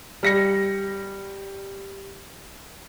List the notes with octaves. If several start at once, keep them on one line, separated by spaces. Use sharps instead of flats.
G3 A#6 C#7